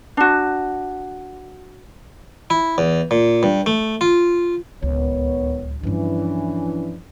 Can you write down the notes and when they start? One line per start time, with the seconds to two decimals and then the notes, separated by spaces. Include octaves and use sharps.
0.17 D4 F#4
2.50 E4
2.78 E2
3.11 A#2
3.43 G2
3.66 A3
4.01 F4
4.82 D1 C#2 D#3 B3 C#5
5.83 G2 E3 F3 C#4 D4